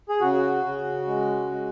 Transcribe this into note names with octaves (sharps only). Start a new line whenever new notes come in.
G#4
C#3 F#4
C#3
G#3
G#3